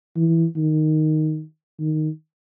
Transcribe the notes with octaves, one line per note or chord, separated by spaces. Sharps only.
E3
D#3
D#3